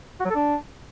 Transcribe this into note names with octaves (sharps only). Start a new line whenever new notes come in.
F#4
F#3
A4
D4